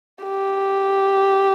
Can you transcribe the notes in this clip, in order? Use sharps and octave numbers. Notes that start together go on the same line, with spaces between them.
G4